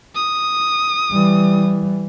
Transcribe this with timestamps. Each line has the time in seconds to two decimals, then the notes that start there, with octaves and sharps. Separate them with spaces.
0.15 D#6
1.12 E3 G3